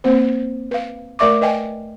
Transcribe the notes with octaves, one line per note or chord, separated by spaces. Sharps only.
A#3 C4 C5
B4 F5
A3 A#4 D5 E5 C#6 D6
B4 D#5 G5 G#5